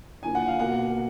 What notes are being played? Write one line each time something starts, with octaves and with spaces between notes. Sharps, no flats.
D3 F3 A#3 G#5
F#5
F5
B2 A#3 F#5